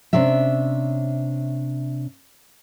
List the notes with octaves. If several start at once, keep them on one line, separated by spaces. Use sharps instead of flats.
C3 C#4 D4 E5